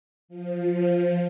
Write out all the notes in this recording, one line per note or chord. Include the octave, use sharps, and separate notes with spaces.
F3